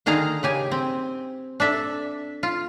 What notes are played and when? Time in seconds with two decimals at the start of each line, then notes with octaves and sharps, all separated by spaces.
0.06 D3 D#3 G#4 F5 A#5
0.43 C#3 G4 G#5
0.71 C4
1.60 D4 A4 E5
2.43 F4